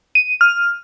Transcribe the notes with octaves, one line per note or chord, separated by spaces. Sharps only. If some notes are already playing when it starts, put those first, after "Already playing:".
D#7
F6